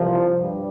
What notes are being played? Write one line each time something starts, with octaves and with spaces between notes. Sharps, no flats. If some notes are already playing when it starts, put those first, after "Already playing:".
Already playing: C2 C3 F3
G2 G3